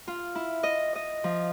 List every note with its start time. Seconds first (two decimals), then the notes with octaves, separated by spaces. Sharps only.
0.08 F4
0.35 E4
0.63 D#5
0.95 D#5
1.24 F3